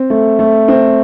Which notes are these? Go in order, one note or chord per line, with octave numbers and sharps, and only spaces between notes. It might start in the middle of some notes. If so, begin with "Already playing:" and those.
Already playing: C4
A3
A3
C4